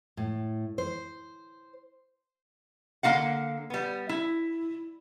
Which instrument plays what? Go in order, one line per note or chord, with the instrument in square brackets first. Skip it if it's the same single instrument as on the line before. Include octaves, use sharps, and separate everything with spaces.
[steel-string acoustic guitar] A2
C5
[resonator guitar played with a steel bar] D3 A#3 F#4 F5 F#5
G3 B3
E4